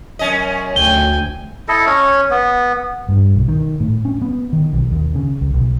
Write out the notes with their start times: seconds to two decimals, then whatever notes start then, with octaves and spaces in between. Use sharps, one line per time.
0.19 F#2 C#4 D#5
0.76 D2 G5 G#5 G7
1.68 E4 A4 D#5
1.86 C#4 C#5
2.31 B3
3.08 G2
3.35 B1
3.48 D#3
3.80 A2
4.05 C#4
4.22 B3
4.53 D#3
4.73 B1
4.91 D#2
5.15 C#3
5.41 C#2
5.54 B1